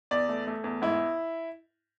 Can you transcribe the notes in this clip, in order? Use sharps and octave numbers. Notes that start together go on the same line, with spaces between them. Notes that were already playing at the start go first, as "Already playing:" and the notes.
E2 D5
A3
A3
E2
G#2 E4